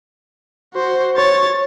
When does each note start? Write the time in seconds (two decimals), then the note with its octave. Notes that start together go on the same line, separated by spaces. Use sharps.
0.74 F#4 C5
1.17 C#5 A6